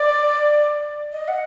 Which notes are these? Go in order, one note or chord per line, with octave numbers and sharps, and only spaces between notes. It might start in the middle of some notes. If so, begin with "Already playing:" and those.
Already playing: D5
D#5
F#5